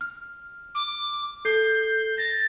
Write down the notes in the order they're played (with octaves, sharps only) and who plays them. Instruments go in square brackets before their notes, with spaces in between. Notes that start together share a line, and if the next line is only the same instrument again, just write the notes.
[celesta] F6
[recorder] D6
[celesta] A4 C7 [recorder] G6
[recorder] A6 [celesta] A#6